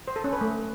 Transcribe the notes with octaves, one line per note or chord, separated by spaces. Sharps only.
C5
A4
C#4
B4
A3